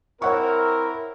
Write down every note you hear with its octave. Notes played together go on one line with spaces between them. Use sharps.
C4 E4 A#4 C#5 F#5 C#6